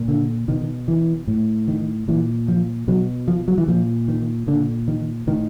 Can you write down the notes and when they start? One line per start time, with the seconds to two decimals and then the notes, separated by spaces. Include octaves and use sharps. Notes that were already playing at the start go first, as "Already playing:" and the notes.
Already playing: A#2
0.08 D3
0.48 B2 D#3
0.88 E3
1.27 A2
1.68 D#3
2.08 A#2 E3
2.48 F3
2.88 B2 F#3
3.28 F3
3.48 F#3
3.58 E3
3.68 A#2 F3
4.08 D#3
4.47 A#2 D3
4.88 D#3
5.27 A2 D#3